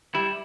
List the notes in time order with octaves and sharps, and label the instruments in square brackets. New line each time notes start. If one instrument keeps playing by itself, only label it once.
[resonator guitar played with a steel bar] G3 [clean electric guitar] E4